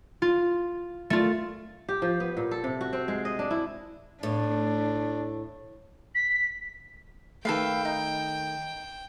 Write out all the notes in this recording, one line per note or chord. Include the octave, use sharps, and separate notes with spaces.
F4
A3 F4
G4
F3
B3
A#2
A4
C3
F#4
C4
G#3
D#5
D4
E4
A2 D4
B6
D#3 A3 A4 B4 F5 G5
D#4